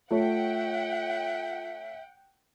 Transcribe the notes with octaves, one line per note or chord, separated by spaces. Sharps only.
A3 F4 C#5 E5 F#5 G5